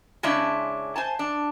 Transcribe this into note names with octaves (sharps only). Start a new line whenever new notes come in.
C#3 G#3 C#4 D4 E4
C5 G#5 A5
D4